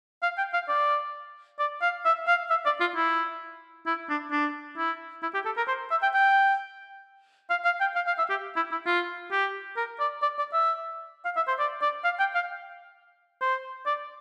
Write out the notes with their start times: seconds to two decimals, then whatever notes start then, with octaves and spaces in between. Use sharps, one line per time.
0.23 F5
0.38 G5
0.53 F5
0.69 D5
1.59 D5
1.82 F5
2.05 E5
2.27 F5
2.50 E5
2.66 D5
2.80 F4
2.96 E4
3.86 E4
4.10 D4
4.32 D4
4.77 E4
5.23 E4
5.34 G4
5.46 A4
5.57 A#4
5.68 C5
5.91 E5
6.02 G5
6.14 G5
7.50 F5
7.65 F5
7.80 G5
7.96 F5
8.07 F5
8.18 E5
8.30 G4
8.56 E4
8.72 E4
8.86 F4
9.32 G4
9.77 A#4
10.00 D5
10.22 D5
10.38 D5
10.53 E5
11.25 F5
11.36 E5
11.48 C5
11.59 D5
11.82 D5
12.04 F5
12.19 G5
12.35 F5
13.41 C5
13.86 D5